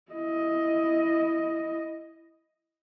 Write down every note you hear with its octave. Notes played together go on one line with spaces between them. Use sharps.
E4 D#5